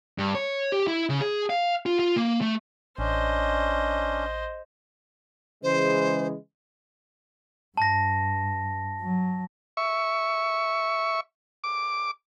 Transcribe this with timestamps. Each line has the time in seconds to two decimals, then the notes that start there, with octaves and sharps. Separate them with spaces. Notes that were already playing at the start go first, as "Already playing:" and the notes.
0.18 G2
0.35 C#5
0.72 G4
0.88 E4
1.09 C#3
1.21 G#4
1.50 F5
1.86 F4
1.99 F4
2.16 A#3
2.41 A3
2.98 A1 C#4 D4 C5 D#5
5.63 C#3 E3 G#3 C5
7.77 G2 A5 A#6
9.02 F#3
9.77 E5 C#6
11.64 D6